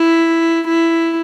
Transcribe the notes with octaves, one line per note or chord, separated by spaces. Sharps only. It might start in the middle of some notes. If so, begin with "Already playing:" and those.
Already playing: E4
E4